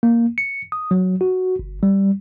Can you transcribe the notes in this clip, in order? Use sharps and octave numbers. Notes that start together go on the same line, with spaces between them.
A#3
C#7
D#6
F#3
F#4
G1
G3